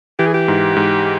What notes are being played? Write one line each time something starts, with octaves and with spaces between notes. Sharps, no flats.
E3 G4
G#4
G4
G#2
G#2